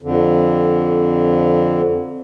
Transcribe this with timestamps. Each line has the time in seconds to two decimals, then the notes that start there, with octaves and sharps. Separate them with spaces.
0.02 F2 D3